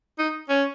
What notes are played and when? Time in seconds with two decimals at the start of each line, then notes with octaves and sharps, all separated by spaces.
0.19 D#4
0.50 C#4